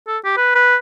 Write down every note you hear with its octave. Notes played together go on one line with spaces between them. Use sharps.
A4
G4
B4
B4